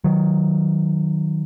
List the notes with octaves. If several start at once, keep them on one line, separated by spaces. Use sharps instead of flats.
D#3 F#3